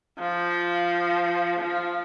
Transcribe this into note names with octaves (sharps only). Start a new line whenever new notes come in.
F3
F3